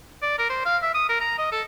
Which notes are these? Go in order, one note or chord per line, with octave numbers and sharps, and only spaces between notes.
D5
A#4
C5
F5
E5
D#6
A#4
A#5
D#5
A4